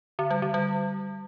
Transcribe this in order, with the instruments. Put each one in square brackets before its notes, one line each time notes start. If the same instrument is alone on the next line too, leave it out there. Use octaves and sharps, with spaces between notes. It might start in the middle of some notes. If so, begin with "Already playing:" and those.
[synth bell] D3
G3
D3
G3